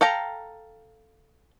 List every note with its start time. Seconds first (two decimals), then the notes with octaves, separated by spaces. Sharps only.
0.01 A4 F5 G5 A#5